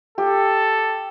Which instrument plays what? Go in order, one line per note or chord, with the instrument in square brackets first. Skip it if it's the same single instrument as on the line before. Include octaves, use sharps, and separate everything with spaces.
[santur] G4 [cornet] A4